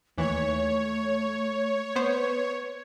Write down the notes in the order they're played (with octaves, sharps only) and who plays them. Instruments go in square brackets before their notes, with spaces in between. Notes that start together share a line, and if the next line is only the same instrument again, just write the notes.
[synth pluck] D#2 E3 [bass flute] A3 [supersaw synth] C#5
[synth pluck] B3 C5 [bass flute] B4